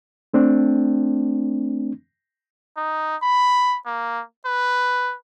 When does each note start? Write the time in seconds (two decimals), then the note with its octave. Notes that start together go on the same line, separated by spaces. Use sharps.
0.34 A3 C4 D4
2.77 D#4
3.22 B5
3.86 A#3
4.45 B4